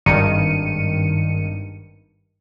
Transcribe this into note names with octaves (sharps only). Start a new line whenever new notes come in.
G#1 G2 D#3 C#7 D#7